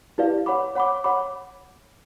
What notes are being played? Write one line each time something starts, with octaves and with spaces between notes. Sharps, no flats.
E4 G4 B4 D5 F5
C#5 F#5 B5 D6
C#5 F#5 B5 D6
C#5 F#5 B5 D6